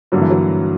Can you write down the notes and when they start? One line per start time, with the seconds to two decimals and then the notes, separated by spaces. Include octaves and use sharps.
0.12 G2 D3 F#3 A#3
0.21 E3
0.30 F#3